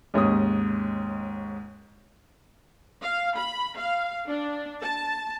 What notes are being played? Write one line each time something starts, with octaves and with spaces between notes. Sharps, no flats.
D#2 G#2 C#4 D#6
F5
B5
F5
D4
A5